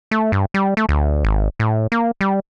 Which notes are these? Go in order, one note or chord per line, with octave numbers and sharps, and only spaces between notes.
A3
G2
G3
A3
D2
G#1
A2
A#3
G3